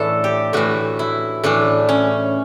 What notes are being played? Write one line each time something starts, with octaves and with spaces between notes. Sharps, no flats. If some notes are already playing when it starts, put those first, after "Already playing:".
Already playing: A2 E3 D4 A4
G4
A2 E3 F#4
E4
A2 E3 D4
C#4